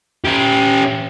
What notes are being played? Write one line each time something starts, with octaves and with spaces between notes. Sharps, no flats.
C#4 G4